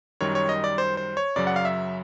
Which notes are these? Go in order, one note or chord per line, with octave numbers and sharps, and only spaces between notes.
F#2 D#3 G3 C#5
C#5
D#5
D5
C5
C5
C#5
F#2 C#3 F#3 D5
F#5
F5
E5